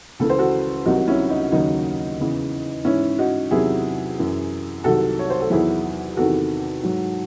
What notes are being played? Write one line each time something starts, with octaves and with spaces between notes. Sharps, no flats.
C#2 C#3 E3 A4
C5
F#4 A4
C2 C3 D#3 F#3 D#4 F#4
C#4 E4
D#4
D#2 C#3 F#3 D#4
E2 C#3 E3
G#2 E3 C#4 E4
D#4 F#4
E2 C3 D#3 F#3 E4 G#4
F#2 E3
C2 C3 D#3 F#3 F#4 A4
C#5
C5
A4
E2 D#3 F#3 E4 G#4
E2 C3 D#3 F#4 A4
G#2 F#3